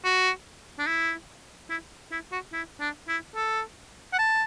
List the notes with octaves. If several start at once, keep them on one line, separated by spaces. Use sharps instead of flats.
F#4
D4
E4
E4
E4
F#4
E4
D4
E4
A4
F#5
A5